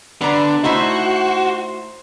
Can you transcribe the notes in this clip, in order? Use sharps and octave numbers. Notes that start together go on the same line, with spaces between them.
D3 B3 D5 A#5
A3 D#4 E4 F#4 C5